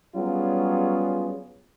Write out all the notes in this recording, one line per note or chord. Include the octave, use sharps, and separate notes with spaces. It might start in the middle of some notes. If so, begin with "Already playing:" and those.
F#3 G3 B3 C#4 F4 G#4